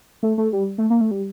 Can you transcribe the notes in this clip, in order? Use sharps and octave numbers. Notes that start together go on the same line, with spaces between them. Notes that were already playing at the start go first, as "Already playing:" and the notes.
A3
A3
G3
A3
A#3
A3
G3